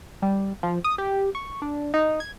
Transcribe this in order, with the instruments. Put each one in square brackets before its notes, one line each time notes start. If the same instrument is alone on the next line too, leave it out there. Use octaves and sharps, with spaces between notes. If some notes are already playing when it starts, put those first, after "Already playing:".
[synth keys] G3
F3
D#6
G4
C#6
D4
D#4
G#6